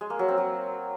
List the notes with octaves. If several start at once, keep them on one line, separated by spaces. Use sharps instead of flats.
G#3
A#3
F#3
C4
F#3